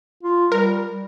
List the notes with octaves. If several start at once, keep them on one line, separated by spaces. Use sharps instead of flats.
F4
G3 A#4